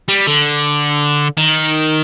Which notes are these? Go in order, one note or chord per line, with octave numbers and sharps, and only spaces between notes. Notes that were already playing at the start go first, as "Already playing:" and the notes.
G3
D3
D#3